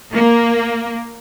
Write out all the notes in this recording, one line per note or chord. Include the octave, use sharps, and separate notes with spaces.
A#3